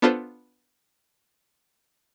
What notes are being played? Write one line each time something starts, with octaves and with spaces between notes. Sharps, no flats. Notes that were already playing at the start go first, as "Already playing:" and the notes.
B3 D4 F4 A4 B4 C5